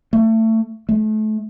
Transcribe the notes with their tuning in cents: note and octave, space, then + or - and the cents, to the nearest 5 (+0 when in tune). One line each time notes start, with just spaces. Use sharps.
A3 +25
A3 -30